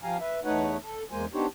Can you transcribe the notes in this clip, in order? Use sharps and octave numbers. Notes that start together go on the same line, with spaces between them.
F3 G4 F5 G#5 A#5
B4 E5
E2 A3 D#4 B4 C#5 F#5
A4
E2 G#3 A#3 C5 G#5
B3 D4 D#4 G4 C5 C#5